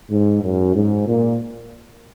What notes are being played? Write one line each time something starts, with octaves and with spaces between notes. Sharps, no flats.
G#2
F#2
G#2
A#2